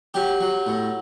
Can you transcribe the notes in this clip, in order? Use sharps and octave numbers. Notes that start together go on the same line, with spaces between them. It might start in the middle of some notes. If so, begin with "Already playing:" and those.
F#3 G4
F#3
A2